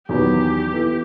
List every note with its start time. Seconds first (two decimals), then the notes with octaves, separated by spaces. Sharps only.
0.08 E2 D#3 F#3 B3 G4
0.73 E3 B3 E4 A4